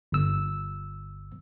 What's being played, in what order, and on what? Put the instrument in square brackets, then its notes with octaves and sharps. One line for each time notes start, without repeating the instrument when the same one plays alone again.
[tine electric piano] G1 E6